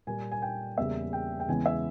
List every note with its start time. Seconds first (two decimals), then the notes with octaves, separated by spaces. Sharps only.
0.07 A#2 G3 A#3 G#5
0.32 G#5
0.42 G5
0.78 E2 C#3 G3 A#3 E5
1.13 G5
1.40 G5
1.48 E2 C#3 E3 G#3 B3 G#5
1.66 E5